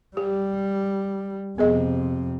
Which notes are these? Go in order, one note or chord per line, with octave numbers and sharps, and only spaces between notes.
G3 G4
F2 C3 B3 G#4 D#5